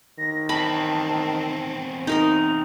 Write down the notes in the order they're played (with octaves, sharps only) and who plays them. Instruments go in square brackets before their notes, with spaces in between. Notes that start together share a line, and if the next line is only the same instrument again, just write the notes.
[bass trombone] D#3 [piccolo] A#6
[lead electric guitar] E2 C4 [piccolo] A5 [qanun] B5
[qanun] D#4 A#4 D#5 [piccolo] F7